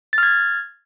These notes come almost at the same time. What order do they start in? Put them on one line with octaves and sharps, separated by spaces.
A6 F6 G#6